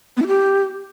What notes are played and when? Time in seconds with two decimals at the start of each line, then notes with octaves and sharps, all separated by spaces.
0.17 B3
0.22 E4
0.27 G4